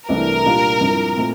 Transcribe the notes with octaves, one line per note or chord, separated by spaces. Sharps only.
C2 C3 E3 A3 D4 A#4
A#2 G3 D4 F4
G2 F3 C4 E4
A#2 A3 C4